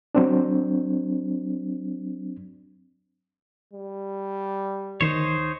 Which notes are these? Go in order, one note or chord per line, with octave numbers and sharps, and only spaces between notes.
F#3 C4 D4
G3
D2 D#3 D#4 C5 C#5